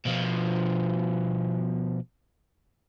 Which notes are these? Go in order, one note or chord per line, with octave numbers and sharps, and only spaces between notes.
B2 F3